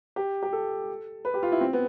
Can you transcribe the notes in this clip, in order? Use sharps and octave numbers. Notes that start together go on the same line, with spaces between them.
G4
G4
A4
B4
G4
F4
E4
C4
B3